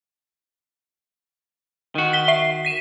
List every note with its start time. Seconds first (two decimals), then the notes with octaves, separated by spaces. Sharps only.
1.95 D#3 F#4
2.13 B6 G7
2.28 E5 C7
2.65 B6 D#7 E7